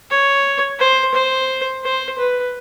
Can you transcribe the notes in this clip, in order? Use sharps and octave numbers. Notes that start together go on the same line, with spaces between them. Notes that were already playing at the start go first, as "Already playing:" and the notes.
C#5
C5
C5
C5
B4